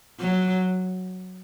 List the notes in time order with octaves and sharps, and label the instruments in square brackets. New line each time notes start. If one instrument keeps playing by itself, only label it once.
[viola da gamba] F#3